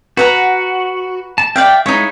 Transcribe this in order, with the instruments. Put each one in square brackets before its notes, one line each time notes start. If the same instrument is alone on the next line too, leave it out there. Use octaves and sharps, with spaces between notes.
[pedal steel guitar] F#4 [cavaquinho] B4 F#5 A#5
[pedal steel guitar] A5
[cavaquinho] D5 F5 G5 [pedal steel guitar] E5 F6 G6
[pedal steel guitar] G#3 E4 F5 [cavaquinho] D#4 C#5